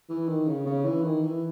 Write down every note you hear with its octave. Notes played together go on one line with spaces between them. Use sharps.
E3
D#3
C#3
C#3
E3
D#3
E3